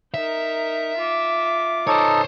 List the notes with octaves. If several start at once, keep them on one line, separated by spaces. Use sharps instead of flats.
D#4 A#4 E5
F4 D6
D#4 A4 C5 C#5